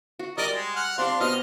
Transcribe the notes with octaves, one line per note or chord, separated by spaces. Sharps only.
F#4
G3 A#4 D5 D#5
G#3
F#5 F6
C4 D4 G4 F5 C6
B2 G4 D#5 F6